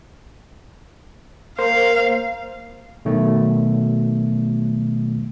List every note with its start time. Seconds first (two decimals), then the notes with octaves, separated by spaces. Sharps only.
1.58 A#3 A#4 C5 F5
3.05 B2 D#3 F#3 A3